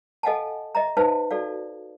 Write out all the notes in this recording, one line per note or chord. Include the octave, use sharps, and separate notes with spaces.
A4 D#5 F5 F#5 G#5 A5
D#5 E5 A#5
D#4 B4 C5 F5 A5
F#4 A4 D5 F5